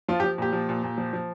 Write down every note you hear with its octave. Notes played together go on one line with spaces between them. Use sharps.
F3 F4
G4
F3
A#2 G4
F3
A#2
A#2
F3
F3